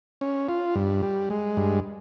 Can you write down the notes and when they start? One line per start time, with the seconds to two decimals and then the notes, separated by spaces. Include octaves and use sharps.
0.21 C#4
0.49 F4
0.75 G2
1.03 G3
1.30 G#3
1.57 G2